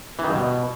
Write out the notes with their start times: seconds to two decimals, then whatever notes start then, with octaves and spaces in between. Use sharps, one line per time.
0.19 E3
0.24 D#3
0.29 G2
0.34 B2